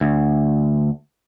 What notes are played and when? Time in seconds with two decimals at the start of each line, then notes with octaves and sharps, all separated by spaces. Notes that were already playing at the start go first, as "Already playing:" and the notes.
0.01 D2